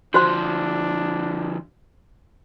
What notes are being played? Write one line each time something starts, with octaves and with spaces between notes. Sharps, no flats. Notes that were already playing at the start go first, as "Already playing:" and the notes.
D3 F3 D4 F#4 C5 C6